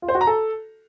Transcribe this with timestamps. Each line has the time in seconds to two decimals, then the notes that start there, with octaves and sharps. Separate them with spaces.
0.02 F4
0.09 C5
0.15 F#4
0.21 A#5
0.27 A4